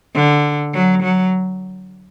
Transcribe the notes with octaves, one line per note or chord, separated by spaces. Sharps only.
D3
F#3
F#3